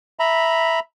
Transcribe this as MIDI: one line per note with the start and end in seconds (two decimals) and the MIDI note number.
0.19 0.80 76
0.19 0.80 82
0.19 0.80 83